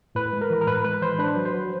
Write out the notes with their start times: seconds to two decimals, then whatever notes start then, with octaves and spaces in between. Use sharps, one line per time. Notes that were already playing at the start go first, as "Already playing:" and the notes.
0.15 A2 B4
0.33 G#3
0.41 A#4
0.50 E3
0.61 A#4
0.67 A2 B4
0.84 G#3 B4
1.02 E3 C5
1.19 D4 B4
1.36 F#3
1.45 C5
1.54 F#3